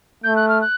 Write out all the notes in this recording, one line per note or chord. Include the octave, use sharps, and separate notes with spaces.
A3 G6
F#6
F6
F#6